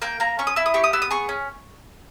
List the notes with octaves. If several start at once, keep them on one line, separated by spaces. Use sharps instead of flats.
A#3 G5
A#3 A#5
C#4 C#6
D#6
E4 E6
D#6
G4 C#6
D#6
B3 E6
D#6
G#4 C#6
C#4